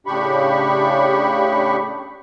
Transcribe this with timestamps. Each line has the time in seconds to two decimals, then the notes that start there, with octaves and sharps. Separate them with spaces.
0.07 A2 C#3 D4 G4 B5 C#6